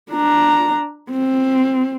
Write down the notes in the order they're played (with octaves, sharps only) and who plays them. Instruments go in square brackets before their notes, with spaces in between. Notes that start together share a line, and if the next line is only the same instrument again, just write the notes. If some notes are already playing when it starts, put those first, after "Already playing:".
[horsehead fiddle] D4 A#5
C4